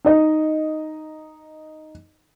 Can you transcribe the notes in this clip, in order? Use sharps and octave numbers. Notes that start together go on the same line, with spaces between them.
D#4 D#5